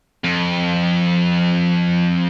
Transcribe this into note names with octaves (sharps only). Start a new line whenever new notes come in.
F2